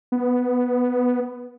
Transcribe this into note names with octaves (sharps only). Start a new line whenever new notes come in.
B3